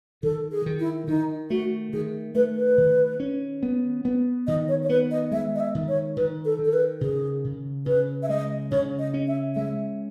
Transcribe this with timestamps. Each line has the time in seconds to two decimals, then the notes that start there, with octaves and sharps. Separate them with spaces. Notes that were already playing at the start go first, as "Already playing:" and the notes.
0.23 D#3 A4
0.52 G#4
0.66 D#3
0.79 E4
1.08 D#3 D#4
1.50 A3 F#4
1.93 D#3 G#4
2.35 A3 B4
2.56 B4
2.78 D#3
3.20 C#4
3.63 B3
4.05 B3
4.47 D#3 D#5
4.68 C#5
4.83 C#5
4.89 B3 B4
5.11 D#5
5.32 G#3 E5
5.55 D#5
5.60 E5
5.75 D#3
5.88 C#5
6.17 D#3 B4
6.45 A4
6.59 D#3
6.65 A4
6.73 B4
7.01 C#3 G#4
7.45 C#3
7.86 C#3 B4
8.23 E5
8.29 G#3 D#5
8.71 C#3 C#5
8.99 D#5
9.14 C#4
9.28 E5
9.56 G#3 E5